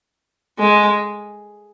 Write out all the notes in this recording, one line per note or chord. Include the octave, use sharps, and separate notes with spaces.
G#3